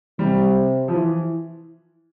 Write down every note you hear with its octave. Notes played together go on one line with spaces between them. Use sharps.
C3 G3
F3
E3